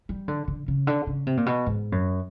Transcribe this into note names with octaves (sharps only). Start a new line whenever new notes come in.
G3
D3
D3
C#3
D3
C#3
C3
A#2
B2
G#2
F#2